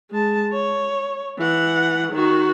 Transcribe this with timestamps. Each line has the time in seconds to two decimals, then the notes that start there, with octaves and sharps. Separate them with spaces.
0.11 G#3 A5
0.53 C#5
1.39 E3 F#5
2.12 D#3 F#4